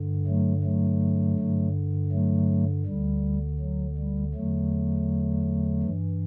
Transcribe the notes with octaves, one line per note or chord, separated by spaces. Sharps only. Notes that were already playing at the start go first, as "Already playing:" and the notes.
Already playing: G2 D3
F#3 A3
F#3 A3
G2 D3
F#3 A3
D2 D3 G3
F#3
G3
E2 D3 F#3 A3
G2 E3